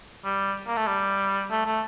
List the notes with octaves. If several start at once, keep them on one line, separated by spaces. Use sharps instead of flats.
G3
A#3
A3
G3
A3
A3